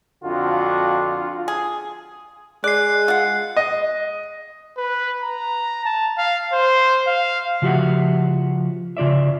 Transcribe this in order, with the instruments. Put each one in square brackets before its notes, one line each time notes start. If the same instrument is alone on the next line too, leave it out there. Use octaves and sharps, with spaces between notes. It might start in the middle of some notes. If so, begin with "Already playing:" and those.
[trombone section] F2 D3 F#4 [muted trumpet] F4
[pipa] G#4
[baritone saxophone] G#3 [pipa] D5 [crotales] F#6 C7
[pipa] F4 F#5
[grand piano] D#5
[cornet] B4
A#5
A5
F5
C5
F5
[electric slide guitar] C#3 F3 F#4 G4 E5 F#5
C#3 F4 D5 E5